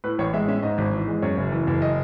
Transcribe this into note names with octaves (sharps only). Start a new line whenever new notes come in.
A2 B4
A1 C#5
G#3 E5
C#4 E5
G#2 D#5
G#1
E3
G#3
F#2 C#5
F#1
E3
F#1
D#5